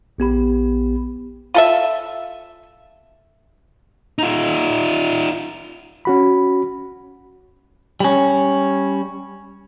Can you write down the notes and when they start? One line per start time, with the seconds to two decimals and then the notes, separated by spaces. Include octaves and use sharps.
0.18 A#1 B3 G4 B5
1.54 F4 A4 E5
4.18 D#4 F4
6.05 C#4 F#4 B5
8.00 G3 C#4